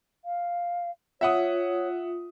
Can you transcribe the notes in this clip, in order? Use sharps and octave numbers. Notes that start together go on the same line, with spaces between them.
F5
F4 C#5 E5 F#5 D#6